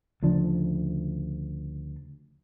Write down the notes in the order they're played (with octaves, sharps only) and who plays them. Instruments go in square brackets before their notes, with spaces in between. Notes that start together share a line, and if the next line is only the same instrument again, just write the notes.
[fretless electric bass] D2 C#3 F3 D4